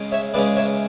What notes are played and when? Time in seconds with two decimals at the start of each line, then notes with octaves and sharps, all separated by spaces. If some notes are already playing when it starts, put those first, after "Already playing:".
Already playing: C#3 G#3 C#4
0.12 C#5 E5
0.34 C#3 G#3 C#4 B4 D5
0.57 C#5 E5